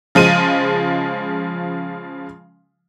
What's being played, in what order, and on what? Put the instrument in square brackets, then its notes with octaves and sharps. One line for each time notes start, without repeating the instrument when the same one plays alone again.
[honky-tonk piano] C#3 F3 G#3 D#7